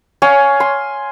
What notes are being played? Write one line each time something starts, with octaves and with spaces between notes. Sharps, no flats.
C#5 F5 G#5
C6